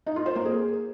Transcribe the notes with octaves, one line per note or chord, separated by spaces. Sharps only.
D#4
F4
C5
A#3
G#4